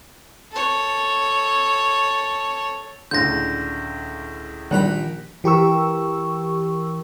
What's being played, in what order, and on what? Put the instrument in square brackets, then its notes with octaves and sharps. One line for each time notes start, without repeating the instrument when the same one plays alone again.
[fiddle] A4 C#5
[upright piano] C#2 A2 D3 [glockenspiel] G6 A#6
[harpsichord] A#1 A#5 B5 [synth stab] D#3 G3 [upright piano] F#6
[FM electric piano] E3 G4 A#4 C#6 E6